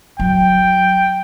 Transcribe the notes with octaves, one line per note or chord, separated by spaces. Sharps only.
F#3 G5